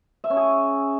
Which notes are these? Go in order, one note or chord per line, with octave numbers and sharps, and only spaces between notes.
E5
C#4
G#4